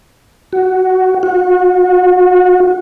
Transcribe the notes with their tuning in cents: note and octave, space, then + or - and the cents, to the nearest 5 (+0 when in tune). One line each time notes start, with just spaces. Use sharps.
F#4 +10
F#4 -30